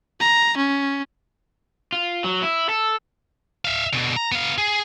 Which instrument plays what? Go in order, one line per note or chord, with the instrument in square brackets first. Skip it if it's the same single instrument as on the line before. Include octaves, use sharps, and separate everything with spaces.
[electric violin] A#5
C#4
[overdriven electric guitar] F4
F#3
E4
A4
[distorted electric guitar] E5 F5
B2 D3
A#5
B3 F5
G#4